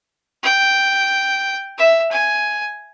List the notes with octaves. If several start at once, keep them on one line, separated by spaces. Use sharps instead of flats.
G5
E5
G#5